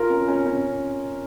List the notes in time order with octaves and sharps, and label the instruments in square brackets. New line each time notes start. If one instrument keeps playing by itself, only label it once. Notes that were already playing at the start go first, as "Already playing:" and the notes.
Already playing: [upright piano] F4 A#4
C#4
C#4
C#4